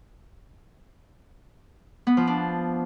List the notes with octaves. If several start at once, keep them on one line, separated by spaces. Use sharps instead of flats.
B3
F3
D4